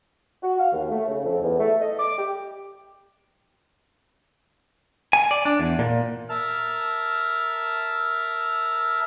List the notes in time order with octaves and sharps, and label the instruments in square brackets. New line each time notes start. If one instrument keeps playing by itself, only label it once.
[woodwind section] F#4
F5
D#2
A3
C#3
F2
E2
A3
D#5
D6
G4
[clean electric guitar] G#5
D5
D4
E2
A#2
[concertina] A#4 E5 A5 F6